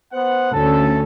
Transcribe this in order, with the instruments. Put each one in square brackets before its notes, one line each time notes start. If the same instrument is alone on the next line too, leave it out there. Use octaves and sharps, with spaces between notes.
[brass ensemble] B3 C5 F#5
[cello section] D2 C#4 [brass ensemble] A4